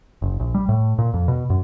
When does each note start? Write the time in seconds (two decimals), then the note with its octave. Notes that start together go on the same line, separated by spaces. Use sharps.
0.22 F#1
0.40 A#1
0.55 G3
0.69 A2
0.99 A#2
1.14 F2
1.28 B2
1.50 F#2